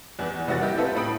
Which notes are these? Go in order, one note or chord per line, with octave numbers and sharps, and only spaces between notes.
E2 E3
F1 G3 E4 F#4 F#5 A6
A#3 E4 G4 D#5
C4 E4 F4 G4 A4 B4
A2 B5 D#6 D7